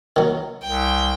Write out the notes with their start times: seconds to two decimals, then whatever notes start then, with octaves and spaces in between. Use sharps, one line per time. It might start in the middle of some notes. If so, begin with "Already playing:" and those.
0.16 D#3 F#3
0.63 C2 G5